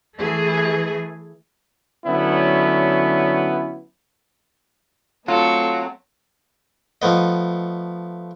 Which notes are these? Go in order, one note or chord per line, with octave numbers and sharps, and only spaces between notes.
E3 A3 G#4
D3 F#3 B3 C#4 E4
F#3 A3 C4 F4 A4 C#6
F3 A3 B3 D#5